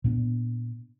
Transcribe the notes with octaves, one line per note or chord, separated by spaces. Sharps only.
A#2 B3 D4